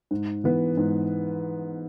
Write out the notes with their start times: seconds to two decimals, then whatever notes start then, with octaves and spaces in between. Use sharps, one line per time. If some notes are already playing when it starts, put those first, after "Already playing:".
0.11 G#2
0.44 E3 B3
0.77 G#2